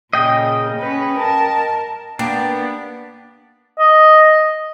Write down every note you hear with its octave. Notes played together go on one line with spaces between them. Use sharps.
A#2 C#3 D#5 G5
C#4 B4
A#4 A5
A#3 B3 D4 G4
D#5